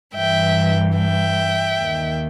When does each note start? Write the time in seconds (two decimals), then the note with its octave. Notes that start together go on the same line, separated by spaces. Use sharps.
0.15 G2 E3 E5 G5
0.97 E5 G5
1.81 D#2 D#3